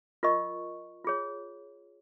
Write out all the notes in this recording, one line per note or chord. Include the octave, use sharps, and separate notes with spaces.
F4 A#4 D#5 C#6
F4 G#4 C#5